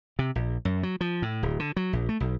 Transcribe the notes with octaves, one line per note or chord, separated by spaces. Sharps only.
C3
A#1
F#2
F#3
F3
A2
D1
D3
F#3
A#1
A3
B1